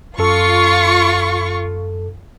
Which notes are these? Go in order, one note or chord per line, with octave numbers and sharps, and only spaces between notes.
F#2 F4 A4 C#6